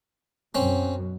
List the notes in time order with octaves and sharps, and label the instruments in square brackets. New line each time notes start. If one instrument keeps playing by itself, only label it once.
[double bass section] F#2 B2 [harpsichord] C4 C#4